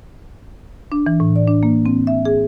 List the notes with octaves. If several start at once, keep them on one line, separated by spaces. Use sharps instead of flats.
D4
E3
A2
D5
D4
A#3
C4
E5
G#4